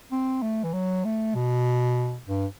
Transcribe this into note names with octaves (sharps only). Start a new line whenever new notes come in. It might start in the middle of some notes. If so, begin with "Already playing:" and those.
C4
A3
E3
F#3
A3
B2
G2